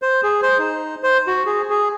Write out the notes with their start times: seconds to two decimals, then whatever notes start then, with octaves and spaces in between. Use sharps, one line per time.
0.02 C5
0.23 G#4
0.42 C5
0.59 D#4
1.03 C5
1.27 F#4
1.46 G#4
1.70 G#4